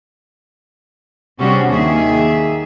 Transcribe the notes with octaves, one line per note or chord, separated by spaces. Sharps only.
C3 G3 C#4 D4 F#4 G#4
D#2 D#3 A#3 G#4 E5